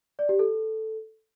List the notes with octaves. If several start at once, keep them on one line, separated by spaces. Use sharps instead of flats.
D5
G4
A4